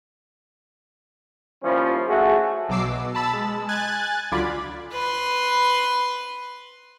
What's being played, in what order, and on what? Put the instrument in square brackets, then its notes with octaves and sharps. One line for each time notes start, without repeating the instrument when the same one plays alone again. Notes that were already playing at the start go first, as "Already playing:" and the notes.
[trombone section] D#2 F3 G3 C#4 E4 C5
A3 F#4 G#4
[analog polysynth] B1 B2 F#3 D6 E6 C7
B2
A5 B5 E6 A6
G#3
G#5 F#6 G#6 A6
C#2 D3 F#3 F4 D5 B5
[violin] B4 C6